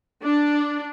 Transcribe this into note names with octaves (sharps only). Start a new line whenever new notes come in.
D4